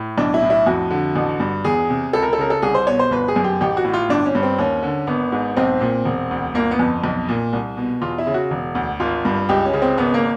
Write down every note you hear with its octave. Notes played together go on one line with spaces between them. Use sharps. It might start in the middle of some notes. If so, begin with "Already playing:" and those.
Already playing: A2
B1 D4
E4
A2
E4
F2 F#4
D3
A1
G2
E2 G#4
C3
C#2 A4
A#4
A4
C#3 A#4
A4
C2 G#4
C5
B2 C#5
C5
G1 B4
G#4
F#2
G4
A1 G4
F#4
A2
F4
G1 D4
C#4
G2
C4
D#2 C#4
D3
G#1 B3
G#2
B1 C4
A#2
E1
D2
G1 A#3
B3
F2
B1
A#2
C2
B2
E2 F4
E4
C#3
F#4
E1
D2
G#1 F4
G2
C#2 G4
C#4
C#3
C4
G#1 B3
A#3